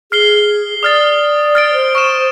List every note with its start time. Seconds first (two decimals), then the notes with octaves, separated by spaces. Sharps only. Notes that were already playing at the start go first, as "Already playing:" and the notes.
0.12 G#4 F6 C7 G7
0.83 D5 D#6 F6 A6
1.55 F6 A6 D7
1.73 C5
1.95 C#6 F6 E7